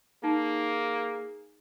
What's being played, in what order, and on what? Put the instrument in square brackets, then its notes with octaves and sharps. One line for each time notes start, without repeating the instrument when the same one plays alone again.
[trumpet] A#3 [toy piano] D#4 [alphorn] G#4